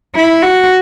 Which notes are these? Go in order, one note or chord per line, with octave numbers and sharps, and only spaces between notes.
E4
F#4